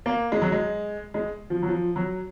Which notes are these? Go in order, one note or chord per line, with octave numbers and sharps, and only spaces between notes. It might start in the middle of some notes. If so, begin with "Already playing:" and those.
A#3
G#3
F#3
G#3
G#3
F3
F#3
F3
F#3